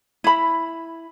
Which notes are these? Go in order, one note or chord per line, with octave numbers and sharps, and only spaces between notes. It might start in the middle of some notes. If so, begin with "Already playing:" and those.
E4 B5